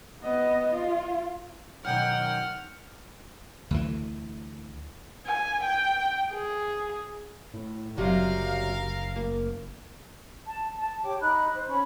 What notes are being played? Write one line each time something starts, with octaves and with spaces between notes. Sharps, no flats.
B3 D#5
F4
F#2 B2 D#3 F#5 G5 F6
D2 E3
G#5
G5
G#4
A2
F#1 C3 F#3 G3 A#4 F5
A#3
A5
A5
G4 C#5 G5 D6
D#4 B5 F#6
C5
C#4 B5 C#6